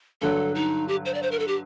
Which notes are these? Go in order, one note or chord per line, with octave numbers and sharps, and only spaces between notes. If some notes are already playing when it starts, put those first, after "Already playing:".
G2 D3 F#3 A4
D#4
G4
C5
D5
C5
A#4
A4
G4